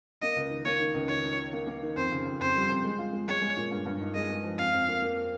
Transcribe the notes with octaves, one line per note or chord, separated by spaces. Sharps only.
A#3 D#5
C#2
D#3
A#3 C#5
D#3
C#2
D#3 C#5
D#4
D#3
A#3
A#3
D#3
F2 C5
C#3
F2
F2 C5
G3
F2
G#3
F4
G#3
G#3 C#5
G#3
A#2
G2
G2
D#4
G#3 D#5
G#3
F3
F2 F5
F2
A#3
A#3